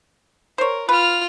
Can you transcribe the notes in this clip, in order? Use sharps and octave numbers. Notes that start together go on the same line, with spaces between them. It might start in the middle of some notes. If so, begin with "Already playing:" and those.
A#4 C5 C#5
F4 B4 F6